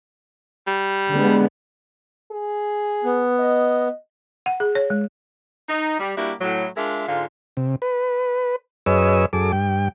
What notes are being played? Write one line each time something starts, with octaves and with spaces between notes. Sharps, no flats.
G3
D3 G#3 B3
G#4
B3
D#5
F#5
G#4
C#5
G#3
D#4
G3
G3 A#3 D4 E4 F#4 G4
A2 F#3
G#3 D4 F4 A#4 E5
G#2 D3 G#3 F4
C3
B4
F#2 G#4 B4 C#5 D#5 E6
F#2 G#4 A4 D6
G2 G5